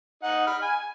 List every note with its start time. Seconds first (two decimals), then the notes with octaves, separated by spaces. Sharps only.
0.23 D#4 F#5
0.47 B5 F6
0.62 G#5